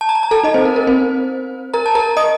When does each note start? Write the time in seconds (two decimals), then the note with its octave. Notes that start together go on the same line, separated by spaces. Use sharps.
0.01 A5
0.09 A#5
0.15 A5
0.23 A#5
0.31 A4 A5
0.44 D#4 D#5
0.54 C4 C5
0.65 A#4
0.76 A#4
0.87 C4 C5
1.74 A#4 A#5
1.86 A5
1.95 A#4 A#5
2.17 D#5 D#6